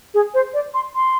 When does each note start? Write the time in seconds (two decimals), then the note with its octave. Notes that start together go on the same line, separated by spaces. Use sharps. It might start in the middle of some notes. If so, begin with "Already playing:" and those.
0.14 G#4
0.34 C5
0.54 D5
0.74 C6
0.95 C6